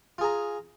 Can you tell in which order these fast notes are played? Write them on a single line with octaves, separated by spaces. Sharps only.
F4 G#4 A#5